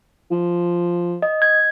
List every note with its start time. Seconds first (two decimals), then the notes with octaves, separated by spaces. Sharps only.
0.31 F3
1.22 D#5
1.42 G#6